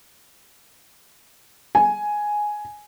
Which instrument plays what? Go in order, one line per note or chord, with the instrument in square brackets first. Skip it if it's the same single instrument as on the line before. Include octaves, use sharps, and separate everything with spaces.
[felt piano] G#5